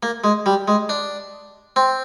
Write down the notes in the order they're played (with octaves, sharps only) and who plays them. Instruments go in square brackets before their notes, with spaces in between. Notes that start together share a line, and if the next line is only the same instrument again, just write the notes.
[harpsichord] A#3
G#3
G3
G#3
D4
C4